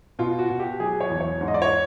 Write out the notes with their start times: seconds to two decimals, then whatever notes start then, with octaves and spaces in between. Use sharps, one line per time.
0.19 B2 F4
0.39 F#4
0.50 B2
0.60 G4
0.80 F#3 G#4
1.01 C#5
1.10 E2
1.21 C#5
1.41 G#2
1.48 D#5
1.54 D5
1.62 C#5